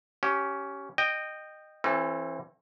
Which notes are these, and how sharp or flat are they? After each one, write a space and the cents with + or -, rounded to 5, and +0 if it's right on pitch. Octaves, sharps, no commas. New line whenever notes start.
C#4 +5 G4 -20
D#5 -15 G5 +0
E3 +20 C4 +45 A4 +0